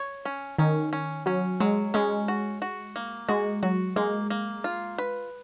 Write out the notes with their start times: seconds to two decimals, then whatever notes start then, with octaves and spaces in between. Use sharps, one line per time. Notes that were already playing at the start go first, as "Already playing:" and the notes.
Already playing: C#5
0.25 C#4
0.58 D#3 C#4
0.93 C#4
1.26 F#3 C#4
1.60 F#3 G#3
1.94 G#3 C#4
2.28 F#4
2.62 F#4
2.96 A#3
3.29 G#3 F#4
3.63 F#3 F#4
3.96 G#3 A#3
4.30 A#3
4.64 F4
4.98 B4